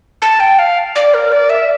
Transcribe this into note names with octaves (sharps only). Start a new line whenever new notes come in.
A5
G5
F5
D5
A#4
D5
E5